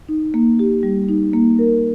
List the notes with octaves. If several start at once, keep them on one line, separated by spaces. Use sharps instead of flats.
D#4
A#3
G4
G3
D#4
A#3
A#4